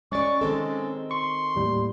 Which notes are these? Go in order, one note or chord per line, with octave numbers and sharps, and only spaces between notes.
G#3 C#4 D5 C#6 A6
D#3 G#3 C4 A4
C6 C#6
D#2 A2 G3